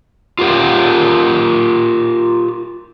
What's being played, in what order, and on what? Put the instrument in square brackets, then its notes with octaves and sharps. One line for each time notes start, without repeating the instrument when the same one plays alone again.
[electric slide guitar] F4 G4 A#4 F#5